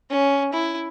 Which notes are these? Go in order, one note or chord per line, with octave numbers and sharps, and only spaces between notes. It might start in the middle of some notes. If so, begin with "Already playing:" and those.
C#4
E4